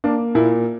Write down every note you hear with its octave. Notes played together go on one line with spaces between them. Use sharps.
A#3 D4
A#2 E4